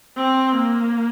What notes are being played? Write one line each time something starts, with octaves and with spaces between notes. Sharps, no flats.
C4
A#3